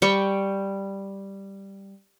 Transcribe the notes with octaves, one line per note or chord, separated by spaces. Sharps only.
G3 G5 C#6